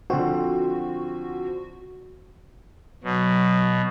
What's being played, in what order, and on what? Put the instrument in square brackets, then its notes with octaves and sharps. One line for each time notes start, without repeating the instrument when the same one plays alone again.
[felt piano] D3 F3 C4 [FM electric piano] F#4
[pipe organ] B2 [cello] F#3